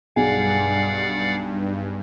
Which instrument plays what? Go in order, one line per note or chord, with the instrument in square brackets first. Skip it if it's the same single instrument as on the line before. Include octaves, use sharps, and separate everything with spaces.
[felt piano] B1 G#4 G#5 [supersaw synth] G2 [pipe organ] D5 F5 F#5